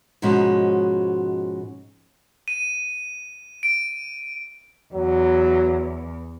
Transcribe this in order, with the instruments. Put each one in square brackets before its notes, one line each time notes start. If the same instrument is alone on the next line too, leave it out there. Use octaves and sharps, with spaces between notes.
[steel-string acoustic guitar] G#2 B2 F3 G#3 C#4 F#4
[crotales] D#7
D7
[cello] E2 [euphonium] F#3